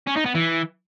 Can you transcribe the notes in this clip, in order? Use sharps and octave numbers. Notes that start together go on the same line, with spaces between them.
C#4
D#4
B3
E3